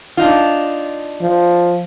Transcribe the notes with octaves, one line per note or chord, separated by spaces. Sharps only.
D4 D#4 F4
F3